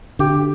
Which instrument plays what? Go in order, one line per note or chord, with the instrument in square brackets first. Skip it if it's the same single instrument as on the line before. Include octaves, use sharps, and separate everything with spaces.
[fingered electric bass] D3 [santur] G4